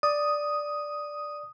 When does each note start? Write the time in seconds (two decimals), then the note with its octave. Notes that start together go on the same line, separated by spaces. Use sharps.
0.03 D5 D#6